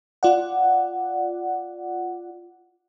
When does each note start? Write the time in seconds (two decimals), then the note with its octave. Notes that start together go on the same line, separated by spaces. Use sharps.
0.23 F4 D5 F#5